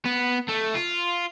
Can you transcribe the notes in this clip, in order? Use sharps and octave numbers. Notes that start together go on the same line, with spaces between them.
B3
A3
F4